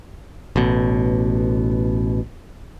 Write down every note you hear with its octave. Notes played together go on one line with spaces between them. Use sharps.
A1 B2